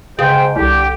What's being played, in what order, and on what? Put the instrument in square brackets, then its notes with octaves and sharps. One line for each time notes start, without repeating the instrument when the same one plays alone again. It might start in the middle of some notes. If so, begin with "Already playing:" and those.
[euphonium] G#2 [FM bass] C#3 [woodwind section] B4 C5 G5
[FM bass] C2 [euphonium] D3 [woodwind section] G4